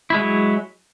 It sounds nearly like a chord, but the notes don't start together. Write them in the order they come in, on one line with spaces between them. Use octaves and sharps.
E4 G#3 F#3